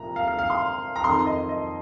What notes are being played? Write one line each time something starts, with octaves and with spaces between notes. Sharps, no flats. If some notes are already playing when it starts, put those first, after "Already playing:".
Already playing: C2 A#2 F3 A#5
F5
F5
F5
C6
A#5
F2 D#3 C6
D#5
D#5